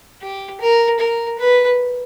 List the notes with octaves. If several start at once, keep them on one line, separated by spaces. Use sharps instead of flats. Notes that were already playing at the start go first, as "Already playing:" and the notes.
G4
A#4
A#4
B4